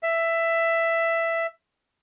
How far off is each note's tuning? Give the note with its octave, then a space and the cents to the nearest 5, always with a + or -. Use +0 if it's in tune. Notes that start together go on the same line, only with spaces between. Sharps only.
E5 +10